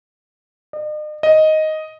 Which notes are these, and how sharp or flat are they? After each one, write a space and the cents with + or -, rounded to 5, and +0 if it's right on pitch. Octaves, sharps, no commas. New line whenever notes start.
D#5 -45
D#5 +5